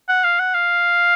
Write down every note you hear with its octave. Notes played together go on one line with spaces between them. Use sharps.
F#5
F5
F#5
F5